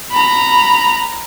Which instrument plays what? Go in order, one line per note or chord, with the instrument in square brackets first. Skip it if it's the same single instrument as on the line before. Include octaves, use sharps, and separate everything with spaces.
[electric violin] A#5 B5